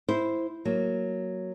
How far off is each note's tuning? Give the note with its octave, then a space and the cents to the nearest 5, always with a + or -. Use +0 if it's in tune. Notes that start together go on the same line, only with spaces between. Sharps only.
E4 +0 C5 -5
F#3 +0 A#3 +0